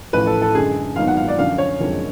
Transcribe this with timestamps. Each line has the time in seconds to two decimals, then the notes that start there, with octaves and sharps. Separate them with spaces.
0.13 A1 A2 F3 B4
0.27 A4
0.42 A4
0.54 F#2 D3 G#3 G#4
0.96 G#1 G#2 F#3 B3 F5
1.08 F#5
1.17 F5
1.28 D5
1.38 F#2 D3 F3 F5
1.58 C#5
1.80 F#1 F2 D3 G#3